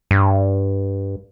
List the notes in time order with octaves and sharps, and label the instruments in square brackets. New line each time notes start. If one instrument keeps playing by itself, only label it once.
[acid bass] G2